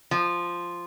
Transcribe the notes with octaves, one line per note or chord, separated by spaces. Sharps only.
F3